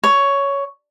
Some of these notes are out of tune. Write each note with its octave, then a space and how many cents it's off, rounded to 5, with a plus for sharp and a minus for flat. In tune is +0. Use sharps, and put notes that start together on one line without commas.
C#5 +10